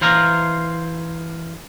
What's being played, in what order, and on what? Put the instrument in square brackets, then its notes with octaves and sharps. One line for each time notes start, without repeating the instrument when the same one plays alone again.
[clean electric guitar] E3 C5 F5 A#5